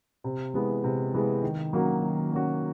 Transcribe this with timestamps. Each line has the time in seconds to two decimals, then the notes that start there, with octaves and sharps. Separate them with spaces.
0.24 C3
0.54 E3 G#3 B3
0.84 C3
1.14 E3 G#3 B3
1.43 D#3
1.73 F#3 A#3 C#4 F#4
2.02 D#3
2.32 F#3 A#3 C#4 F#4